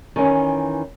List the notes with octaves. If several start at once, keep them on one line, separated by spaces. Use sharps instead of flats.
D#3 E3 C#4